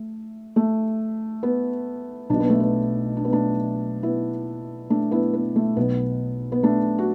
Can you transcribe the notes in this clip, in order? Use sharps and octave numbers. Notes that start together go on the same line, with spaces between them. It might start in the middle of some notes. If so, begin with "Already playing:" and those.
Already playing: A3
A3
B3
B1 B2 D4
B3
A3
B3
D4
B3
A3 D4
B3 E4
A3 D4
B3 E4
B3
A3
B1 B2 B3
B3
A3 D4
F#4